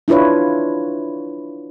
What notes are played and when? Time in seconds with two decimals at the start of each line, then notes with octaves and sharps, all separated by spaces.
0.08 D4 E4 F4 B4 C#5